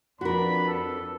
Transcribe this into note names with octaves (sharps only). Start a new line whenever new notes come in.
F2 D4 F#4 A#4 B4 B5
A4